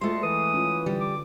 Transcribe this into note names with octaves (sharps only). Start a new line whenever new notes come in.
D2 G#3 A3 F4 C6
E3 B4 D#6
C#4 F4
D3 G3
D6